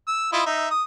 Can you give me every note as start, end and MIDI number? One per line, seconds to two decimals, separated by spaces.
0.08 0.29 88
0.33 0.42 64
0.33 0.42 65
0.33 0.42 75
0.46 0.68 63
0.46 0.68 76
0.71 0.83 87